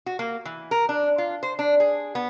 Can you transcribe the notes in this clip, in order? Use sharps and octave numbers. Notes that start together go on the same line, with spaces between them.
F#4
A#3
E3
A#4
D4
F4
C5
D4
G#4
B3